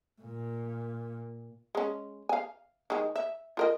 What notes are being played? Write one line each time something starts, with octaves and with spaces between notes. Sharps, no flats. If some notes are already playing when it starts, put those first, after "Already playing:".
A#2
G#3 C#4
F5 G#5
D#3 G#3
E5
F4 A#4 D#5